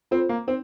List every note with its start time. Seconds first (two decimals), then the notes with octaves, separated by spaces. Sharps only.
0.11 C4 F4 A4 C5
0.29 A#3
0.47 C4 D#4